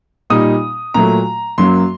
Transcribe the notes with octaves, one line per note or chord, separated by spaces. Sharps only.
A#2 G3 A#3 D#4 D#6
A#2 F#3 A3 A#5
F#2 F#3 A#3 C6